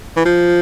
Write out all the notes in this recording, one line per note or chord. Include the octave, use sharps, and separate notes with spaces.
E3
F3